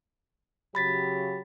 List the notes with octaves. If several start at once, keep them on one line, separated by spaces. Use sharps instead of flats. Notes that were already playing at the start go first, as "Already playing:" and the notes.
C#3 F#3 G4 B5 A6 B6